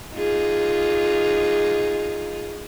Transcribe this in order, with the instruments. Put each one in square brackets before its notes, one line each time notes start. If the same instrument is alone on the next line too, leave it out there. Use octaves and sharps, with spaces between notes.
[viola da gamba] D#4 F4 G#4